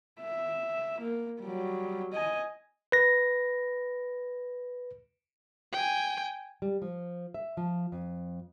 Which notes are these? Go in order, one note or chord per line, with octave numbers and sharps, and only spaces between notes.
E5
A#3
F#3 G3
D#5 G#5
B4 A#6
G5 G#5
G3
F3
E5
F3
F2